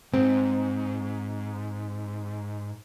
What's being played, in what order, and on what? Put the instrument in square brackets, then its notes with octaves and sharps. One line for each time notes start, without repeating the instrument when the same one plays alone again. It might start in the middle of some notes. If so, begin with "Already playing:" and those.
[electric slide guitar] G#2 [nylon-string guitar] C4